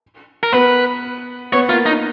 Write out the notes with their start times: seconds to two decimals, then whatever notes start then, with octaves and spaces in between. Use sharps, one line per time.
0.43 A#4
0.52 B3 B4
1.52 B3 C#5
1.69 A#3 F4
1.86 D#4